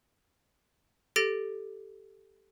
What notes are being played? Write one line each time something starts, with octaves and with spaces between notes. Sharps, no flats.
G4 A4 A6 A#6 D7